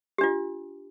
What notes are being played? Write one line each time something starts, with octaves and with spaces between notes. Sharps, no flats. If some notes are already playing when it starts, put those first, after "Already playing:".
D4 F4 G4